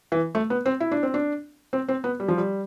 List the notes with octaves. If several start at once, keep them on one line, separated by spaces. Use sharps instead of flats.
E3
A3
B3
C4
E4
D4
C4
D4
C4
C4
B3
G3
F3
G3